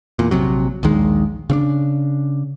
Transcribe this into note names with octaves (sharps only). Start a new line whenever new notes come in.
E2 A#2
A#1 C3 F#3
A#1 D#2 D#3 G#3
C#3 C4 D4